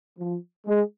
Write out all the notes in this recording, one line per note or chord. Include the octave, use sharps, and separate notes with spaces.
F3
G#3